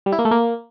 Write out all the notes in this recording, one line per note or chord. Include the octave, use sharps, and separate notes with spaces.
G3
E4
A#3
A3
A#3